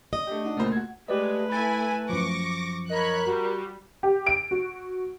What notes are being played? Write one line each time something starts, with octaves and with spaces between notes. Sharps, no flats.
D#5
A3 D4 G4
D4 D#4 F#4
C#2 A#2 A3 A#3 C5
F#4 G#6
G#3 A3 G4 B4 D5 D#5
E4 G#5 B5 A6
F#2 F3 C#6 D6 A#6
A#4 C#5 D#5 B5 F#6
G3 F#4
G4
D7
F#4